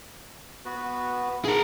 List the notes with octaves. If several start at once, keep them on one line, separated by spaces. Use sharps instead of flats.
B3 F#4 B4
G#4 A#4